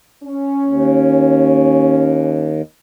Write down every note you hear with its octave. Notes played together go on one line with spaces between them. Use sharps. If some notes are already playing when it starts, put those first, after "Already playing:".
C#4
D#2